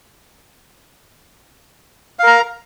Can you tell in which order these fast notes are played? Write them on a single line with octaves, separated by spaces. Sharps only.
F5 A#4 A#5